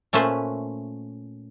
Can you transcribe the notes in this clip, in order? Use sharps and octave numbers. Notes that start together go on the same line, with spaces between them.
A#2 A3 C#4 B4 C5 E5